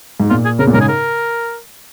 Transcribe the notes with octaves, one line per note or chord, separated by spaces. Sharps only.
G#2
A#2 F4
G#4
C#3 A#4
A#2
G#2 C#3 A#4
G#4
A#4